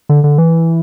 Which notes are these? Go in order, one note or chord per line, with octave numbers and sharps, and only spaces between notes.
D3
D3
E3